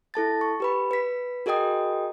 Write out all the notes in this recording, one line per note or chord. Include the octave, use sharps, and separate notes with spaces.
E4 A4 A5 A6
C#6
G4 B4 B5
B4 B6
F#4 G#4 A#4 D#5 G5 D#6